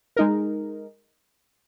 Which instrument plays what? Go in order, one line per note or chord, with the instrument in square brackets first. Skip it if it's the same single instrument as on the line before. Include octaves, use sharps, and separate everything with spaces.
[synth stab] G#3 D#4 A#4